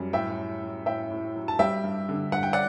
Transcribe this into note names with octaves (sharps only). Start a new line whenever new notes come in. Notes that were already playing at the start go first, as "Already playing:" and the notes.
Already playing: F#2 G3
A2 E5 G5
F#3
F#3
A2 E5 G5
A2
F#3
A5
G3 E5 G5
G2
D3
G2 F#5
G5
D5 F#5